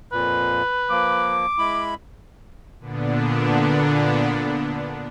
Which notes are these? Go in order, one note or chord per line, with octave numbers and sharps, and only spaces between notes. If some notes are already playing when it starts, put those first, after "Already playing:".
F2 A#2 B4
F3 A#3 D6
G#3 E4 B5
A#2 D3 B3 D4